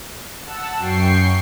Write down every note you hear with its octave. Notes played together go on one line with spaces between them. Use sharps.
F#5 A5 E6
F#2 G5 C#6 C7